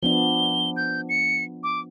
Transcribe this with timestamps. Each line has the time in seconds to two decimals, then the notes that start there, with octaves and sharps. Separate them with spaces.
0.03 F3 B3 D4 G7
0.77 G6
1.09 C#7
1.63 D6